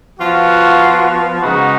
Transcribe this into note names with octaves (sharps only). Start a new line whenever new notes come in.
F3 B3 F4 F#4
F4
C#3 G#3 B3 D#4 F#4